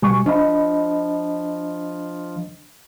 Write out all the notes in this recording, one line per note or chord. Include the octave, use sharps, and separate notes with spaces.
B2 G3 G#5 C#6
F3 D4 D#5 B5